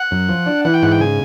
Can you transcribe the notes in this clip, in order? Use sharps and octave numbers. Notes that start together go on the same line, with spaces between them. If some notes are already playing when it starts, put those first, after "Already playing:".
Already playing: F#5
F#2
F3
D4
E3 F#5
G5
G#2 F#5
G5
C#3 G#5